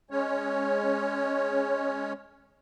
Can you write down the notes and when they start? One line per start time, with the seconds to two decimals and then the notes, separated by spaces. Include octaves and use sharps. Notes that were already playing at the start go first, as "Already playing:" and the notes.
0.11 G#3 C#4 C#5